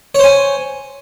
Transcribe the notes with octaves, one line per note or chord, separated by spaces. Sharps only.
C5 C#5 G#5